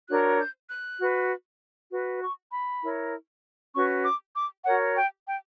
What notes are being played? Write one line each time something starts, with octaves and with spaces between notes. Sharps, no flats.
D4 F#4 A#4 C#5 F#6
G6
F#6
F#4 B4
F#4 B4
C#6
B5
E4 A#4 C#5
C#4 F#4 B4 C#6
D6
D6
F#4 A#4 C#5 F#5
G5
G5